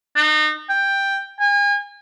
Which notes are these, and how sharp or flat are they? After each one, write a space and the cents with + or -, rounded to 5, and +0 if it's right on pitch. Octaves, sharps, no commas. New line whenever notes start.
D#4 -30
G5 +10
G#5 -35